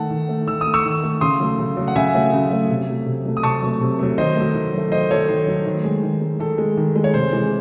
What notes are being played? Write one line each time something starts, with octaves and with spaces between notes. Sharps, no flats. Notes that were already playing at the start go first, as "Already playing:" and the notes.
Already playing: D#3 A3 F#5 A5
D#3
A3
D#3 E6
A3 D#6
C#6 E6
D#3
A3
C#3 C6 D#6
F#3 A3
C#3
F#3 A3
F#5
C#3 E5 G#5
F#3 A3
C#3
F#3 A3
C3
F#3 A3
C3
F#3 A3
D#6
C3 A5 C#6
F#3 A3
C3
F#3 A3
D#3 C5 D#5
F#3 A3
D#3
F#3 A3
D#3 C5 D#5
F#3 A3 A4 C#5
D#3 C5
F#3 A3
D#3
G#3
D#3
G#3
D#3 A4
G#3
D#3
G#3
C#5
C3 C5
E3 G#3